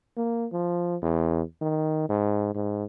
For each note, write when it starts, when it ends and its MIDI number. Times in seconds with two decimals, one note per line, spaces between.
0.17 0.47 58
0.53 0.96 53
1.03 1.42 40
1.61 2.04 51
2.10 2.53 44
2.55 2.84 44